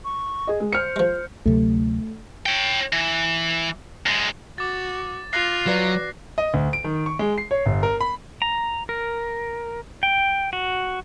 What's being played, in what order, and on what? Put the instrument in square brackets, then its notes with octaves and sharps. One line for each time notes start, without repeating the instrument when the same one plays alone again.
[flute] C#6
[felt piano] G#4 D#5
G#3
[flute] C5 [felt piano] F6 C#7
[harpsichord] F3 G#3
[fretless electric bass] D2 C3 F#3 [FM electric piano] A3
[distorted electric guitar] C#5 G5
E3
F#2 G#3
[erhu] F#4 [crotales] D6 A6
[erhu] F4 [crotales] F#6 A#6 C7
[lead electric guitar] F#3 [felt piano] F#4 B4 D5
[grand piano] D#5
D2
D7
D#3
C#6
G#3
C7
C#5
G1
A#4
B5
[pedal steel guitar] A#5
A#4
G5
F#4